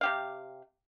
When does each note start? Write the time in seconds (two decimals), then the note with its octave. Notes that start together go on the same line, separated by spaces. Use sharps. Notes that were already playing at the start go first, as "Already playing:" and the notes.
0.01 C3 G4 F5